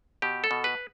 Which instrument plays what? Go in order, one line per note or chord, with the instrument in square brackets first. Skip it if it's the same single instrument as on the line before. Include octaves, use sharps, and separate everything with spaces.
[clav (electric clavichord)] B2 G4
A4
B2
B4